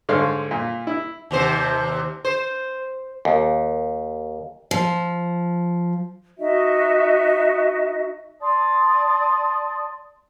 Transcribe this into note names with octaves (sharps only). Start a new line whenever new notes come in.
G#2 D3 C#5 F5 C6
A#2
E4
D#2 C3 C5
C5
D#2
F3
D#4 F#4 D#5 E5
D5 A5 C6 D#6